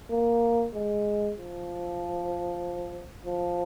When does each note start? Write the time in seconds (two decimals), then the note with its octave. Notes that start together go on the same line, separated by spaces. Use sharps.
0.11 A#3
0.75 G#3
1.37 F3
3.25 F3